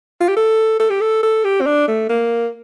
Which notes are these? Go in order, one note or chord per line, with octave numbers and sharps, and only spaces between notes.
F4
G4
A4
A4
G4
A4
A4
G4
C4
D4
A3
A#3